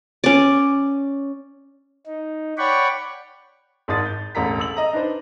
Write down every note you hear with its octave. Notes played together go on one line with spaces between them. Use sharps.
C#4 D5
D#4
C#5 D5 F#5 G5 B5 C#6
G#1 G#2 A5 D#6 A6
G6
E1 A1 A4 A#5 B6
E6 F#7
D#5 A#5
D4 D#4 B4 C5